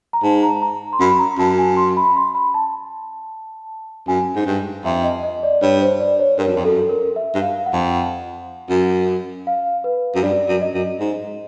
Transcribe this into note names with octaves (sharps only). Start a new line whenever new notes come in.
A#5
G#2 A5
A#5
A#5
C6
F#2 B5
A#5
F#2 A5
G#5
C6
B5
C6
B5
A5
F#2 G#5
G#2
G2
F2 E5
D#5
D#5
D5
G2 C#5
C5
D5
C#5
G2 A#4
F#2
F2
F#2 A4
A#4
E5
G2
F5
F#5
F2
F#2
F5
B4
F#2
G2 D5
F#2
D#5
F#2
G#2